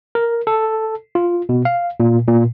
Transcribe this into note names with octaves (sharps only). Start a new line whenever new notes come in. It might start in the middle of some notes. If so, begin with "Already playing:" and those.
A#4
A4
F4
B2
F5
A#2
A#2